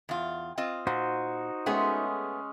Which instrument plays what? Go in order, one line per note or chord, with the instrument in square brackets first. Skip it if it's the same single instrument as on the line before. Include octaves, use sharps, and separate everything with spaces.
[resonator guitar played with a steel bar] E2 F4
C4 F4 D#5
[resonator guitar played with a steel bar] A#2 [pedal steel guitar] D#4 F#4 C5
[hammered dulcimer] G#3 C#4 [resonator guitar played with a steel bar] A3 B3 G#4